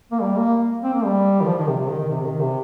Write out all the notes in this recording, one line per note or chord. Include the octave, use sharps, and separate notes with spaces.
A#3
G3
A#3
C4
A#3
G3
D#3
F3
D#3
C3
C3
D#3
D#3
C3
C3
D#3
C3